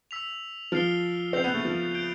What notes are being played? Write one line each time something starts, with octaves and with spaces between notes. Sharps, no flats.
E6 B6 F7
F3 F6 C7 G7
C4 G6 C7 F7
B3
A3
F3
G6 D7 G7